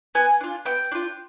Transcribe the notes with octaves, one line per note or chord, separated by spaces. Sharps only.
B3 G#5
D4 F4
B3 G5
D4 F4